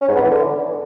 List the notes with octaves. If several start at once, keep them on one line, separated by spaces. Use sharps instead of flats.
C#4
G#2
B3
E3
D3